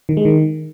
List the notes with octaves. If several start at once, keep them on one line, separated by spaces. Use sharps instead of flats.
D#3
G#3
D#3